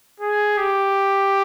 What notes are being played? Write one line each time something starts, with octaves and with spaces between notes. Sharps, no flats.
G#4
G4